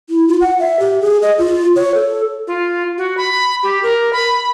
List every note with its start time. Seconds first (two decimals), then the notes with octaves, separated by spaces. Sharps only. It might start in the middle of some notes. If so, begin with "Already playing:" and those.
0.10 E4
0.28 F4
0.41 F#5
0.59 E5
0.80 G4
1.01 G#4
1.22 D#5
1.38 F4
1.76 C#5
1.95 A4
2.47 F4
2.98 F#4
3.17 B5
3.63 G4
3.83 A#4
4.13 B5